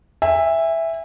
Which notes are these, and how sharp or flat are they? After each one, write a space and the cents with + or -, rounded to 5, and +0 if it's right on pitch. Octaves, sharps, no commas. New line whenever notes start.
E5 +0 G#5 -35